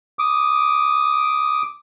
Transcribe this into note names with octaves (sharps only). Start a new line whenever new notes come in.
D6 D#6